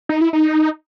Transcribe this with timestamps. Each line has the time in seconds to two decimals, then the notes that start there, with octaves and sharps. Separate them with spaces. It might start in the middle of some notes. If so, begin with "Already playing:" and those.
0.09 D#4
0.21 E4
0.33 D#4